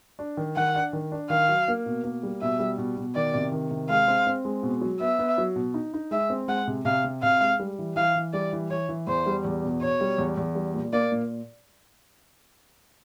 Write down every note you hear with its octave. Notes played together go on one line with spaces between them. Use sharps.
D4
D#3
D#3 F#5
D4
D#3
D4
D#3 F5
F#3
A#3
B2
A#3
G3
B2 E5
G3
B2
B2
D#3 D5
C3
D#3
C3
G#3 F5
C4
C4
G#3
B2
F#3
B3 E5
B3
F#3
B2
D#4
D#4
G#3 E5
C4
G#3 F#5
C3
C3 F5
C3
C3 F5
G#3
G3
E3
E3 F5
E3
G3 D5
E3
E3 C#5
E3
E2 C5
G3
E2
B2
B2 C#5
G3
E2
E2
G3
A#2
A#3 D5
A#2